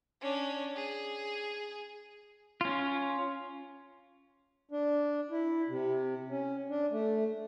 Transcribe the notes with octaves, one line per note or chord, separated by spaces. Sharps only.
C#4 D4
G#4
C#4 F4
D4
E4
C3
C#4
D4
A3